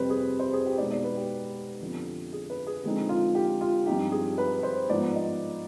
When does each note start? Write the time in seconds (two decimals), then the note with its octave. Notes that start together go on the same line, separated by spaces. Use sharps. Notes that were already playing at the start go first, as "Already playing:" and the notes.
Already playing: F2 C3 G3 C4 B4 C5
0.10 G#4
0.39 C5
0.53 G#4
0.66 G4
0.78 B2 G#3 B3 D#4 D5
0.91 D5
1.04 B4
1.17 G4
1.81 F2 D3 F3 B3
2.33 G#4
2.50 B4
2.67 G#4
2.84 D3 F3 G#3 C4 D#4
3.09 F4
3.35 G4
3.61 F4
3.86 G2 F3 C4 D#4 G4
4.12 G#4
4.38 B4
4.63 C5
4.89 G#2 F3 B3 D#4 D5
5.15 D#5